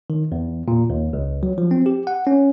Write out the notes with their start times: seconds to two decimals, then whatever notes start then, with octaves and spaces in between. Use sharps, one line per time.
0.10 D#3
0.32 E2
0.68 A#2
0.90 D#2
1.13 C#2
1.43 F#3
1.58 F3
1.71 C4
1.86 G4
2.07 F#5
2.27 C#4